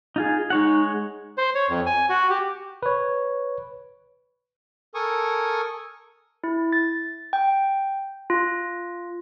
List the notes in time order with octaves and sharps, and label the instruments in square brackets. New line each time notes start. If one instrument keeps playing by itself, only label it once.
[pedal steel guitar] D#4 F4 G#4
[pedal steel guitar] G#3 C#5 F#5 [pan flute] D#4
[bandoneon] C5
C#5
F2
G#5
F#4
G4
[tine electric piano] B4 C#5
[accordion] A4 A#4 G#5 C#6 D#6
[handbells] E4
A6
G5
F4